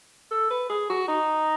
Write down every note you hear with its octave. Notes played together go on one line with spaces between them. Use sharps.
A4
B4
G#4
F#4
D#4